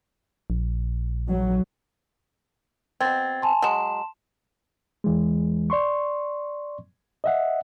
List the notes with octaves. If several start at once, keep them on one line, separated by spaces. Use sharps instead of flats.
A#1
F#3
B2 C4 G#6 A6
G#5 A5 C6
F#3 G#3 A5 C6 E7
E2 E3 G#3
D5 C6 C#6
D#5 E5 F#5